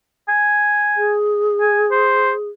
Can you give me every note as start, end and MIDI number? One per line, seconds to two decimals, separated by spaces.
0.28 1.14 80
0.97 2.49 68
1.61 1.85 80
1.91 2.32 72